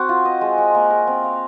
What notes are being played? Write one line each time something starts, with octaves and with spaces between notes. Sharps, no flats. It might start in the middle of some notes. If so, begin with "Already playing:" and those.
Already playing: C4 F#4
F4
D#5
G#3
G#3
A#3
A#4
C4
F5